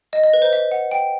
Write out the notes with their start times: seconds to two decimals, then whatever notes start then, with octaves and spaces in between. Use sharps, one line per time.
0.13 D#5
0.24 D#5
0.33 B4
0.42 C5
0.53 E5
0.71 F#5
0.91 G5